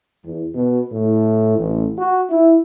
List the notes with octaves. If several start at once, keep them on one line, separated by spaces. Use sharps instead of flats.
E2
B2
A2
A1
F#4
E4